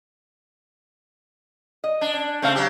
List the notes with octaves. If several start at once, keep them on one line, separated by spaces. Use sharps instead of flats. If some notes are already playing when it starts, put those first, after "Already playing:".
D#5
D4
C#4
C#3 A3 C4 F5
F#3 G4